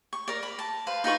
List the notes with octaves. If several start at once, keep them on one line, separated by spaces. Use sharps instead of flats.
C#6
A#4 D5
B5
A5
B4 C5 F5
D#4 F4 B4 C#6